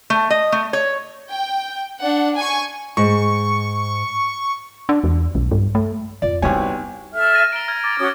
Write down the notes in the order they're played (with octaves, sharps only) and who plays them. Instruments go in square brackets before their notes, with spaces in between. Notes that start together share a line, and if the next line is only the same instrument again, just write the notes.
[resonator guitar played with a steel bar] A3
D#5
A3
C#5
[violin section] G5
D4 F#5
G#5 C#6
[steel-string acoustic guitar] G#2 [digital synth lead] C#6
[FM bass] D4
E2
B1
G2
A3
[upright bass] F2 F4 [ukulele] D5
[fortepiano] C2 G#5 [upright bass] B3 D#4 [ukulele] F#4 B4 C#5
[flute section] A4 E5 F6
[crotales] A6 A#6 D#7
[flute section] A#5 [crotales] D7 G7
[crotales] F6 G#6 A6
D6 A6
[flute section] C#4 F#4 D#6